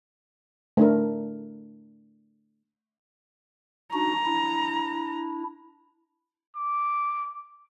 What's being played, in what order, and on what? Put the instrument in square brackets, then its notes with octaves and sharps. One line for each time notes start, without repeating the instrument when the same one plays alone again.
[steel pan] A3 D4 A#4
[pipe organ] D4 D#4 F#4 [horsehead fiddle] A#5
[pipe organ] D4 E4
[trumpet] D6